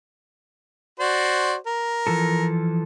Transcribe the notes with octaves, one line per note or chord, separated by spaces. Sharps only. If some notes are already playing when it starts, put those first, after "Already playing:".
F#4 C5 D5
A#4
E3 F3 A4